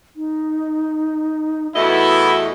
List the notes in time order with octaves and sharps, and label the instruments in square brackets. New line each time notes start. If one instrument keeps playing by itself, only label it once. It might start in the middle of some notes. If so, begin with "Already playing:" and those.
[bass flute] D#4
[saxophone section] E2 A3 D#5 [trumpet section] B3 E4 [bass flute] F#4